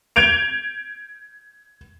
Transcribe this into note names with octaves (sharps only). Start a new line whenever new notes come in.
G6 G#6 D7 F7